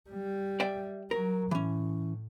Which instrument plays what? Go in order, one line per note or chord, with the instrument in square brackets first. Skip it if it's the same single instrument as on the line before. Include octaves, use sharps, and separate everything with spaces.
[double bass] G3
[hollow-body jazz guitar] D5 E5 G5
[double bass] F#3 [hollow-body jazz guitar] A#4
[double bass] A2 [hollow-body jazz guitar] E3 C#4